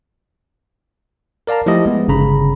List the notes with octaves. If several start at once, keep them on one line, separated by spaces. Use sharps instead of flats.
A#4 D5 F5 A5 A#5
F3 A3 E4 F4 G4 D#5
G#3 B3
G1 C#3 A#5 B5